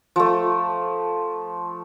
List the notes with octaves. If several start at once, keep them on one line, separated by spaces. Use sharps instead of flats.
F3 A3